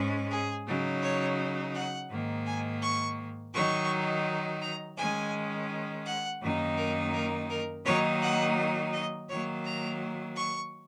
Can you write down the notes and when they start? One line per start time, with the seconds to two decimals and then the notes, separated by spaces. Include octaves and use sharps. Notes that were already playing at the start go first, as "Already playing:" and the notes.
Already playing: G#2 G#3 C#4
0.30 G#4
0.66 C#3 F#3 D#4
1.01 C#5
1.74 F#5
2.10 G#2 D#3 A#3
2.46 G#5
2.82 C#6
3.53 D#3 F#3 D#4 C#6
4.61 A#5
4.97 D#3 G#3 C#4 G#5
6.05 F#5
6.41 F#2 D#3 A#3 D#4
6.77 A#4
7.13 A#4
7.49 A#4
7.85 D#3 F#3 A#3 D#4 C#5
8.21 F#5
8.93 D#5
9.29 D#3 F#3 A#3 C#5
9.65 A#5
10.36 C#6